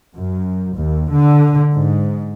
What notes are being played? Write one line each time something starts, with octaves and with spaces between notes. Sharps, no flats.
F#2
D#2
D3
G#2